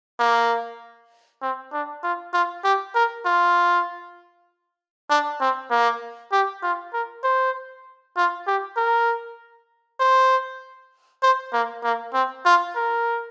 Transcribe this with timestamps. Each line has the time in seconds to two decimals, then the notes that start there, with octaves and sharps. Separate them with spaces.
0.19 A#3
1.42 C4
1.73 D4
2.03 F4
2.33 F4
2.64 G4
2.95 A#4
3.25 F4
5.10 D4
5.40 C4
5.71 A#3
6.32 G4
6.63 F4
6.93 A#4
7.24 C5
8.16 F4
8.47 G4
8.77 A#4
10.00 C5
11.23 C5
11.53 A#3
11.84 A#3
12.14 C4
12.45 F4
12.76 A#4